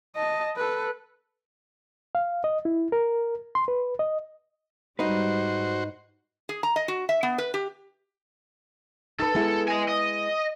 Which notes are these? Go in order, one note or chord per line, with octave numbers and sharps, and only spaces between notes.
D#5 A5
A4 B4
F5
D#5
E4
A#4
C6
B4
D#5
G#2 G3 D#4 F#4 B4 C5
G#4
A#5
D#5
F#4
E5
B3
B4
G4
D#4 A4 B4
G#3 B3 E4
D#5 G#5
D#5